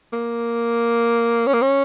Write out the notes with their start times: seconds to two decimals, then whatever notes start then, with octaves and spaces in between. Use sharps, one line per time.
0.13 A#3
1.47 C#4
1.54 A#3
1.62 C#4